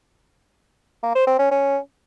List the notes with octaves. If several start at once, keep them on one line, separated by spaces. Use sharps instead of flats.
A#3
C5
C4
C#4
C#4